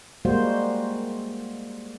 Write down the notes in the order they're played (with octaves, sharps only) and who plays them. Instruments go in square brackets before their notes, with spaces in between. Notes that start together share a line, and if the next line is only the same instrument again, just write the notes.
[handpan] G3 G#3 A#3 F#4 C5